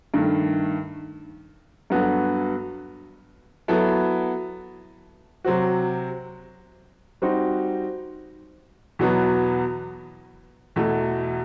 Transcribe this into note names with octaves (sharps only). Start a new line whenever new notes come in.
G2 D#3 A3
G2 F#3 B3 F#4 A4
F#3 B3 E4 A4
C3 F#3 C4 F#4
G3 C4 D#4 F#4
E2 B2 F#3 B3
E2 B2 A3